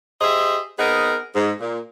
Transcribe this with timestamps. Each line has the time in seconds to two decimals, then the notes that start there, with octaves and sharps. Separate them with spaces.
0.21 G4 G#4 C5 D#5 E5
0.79 B3 C4 D#4 G#4 A#4
1.35 G#2
1.61 A#2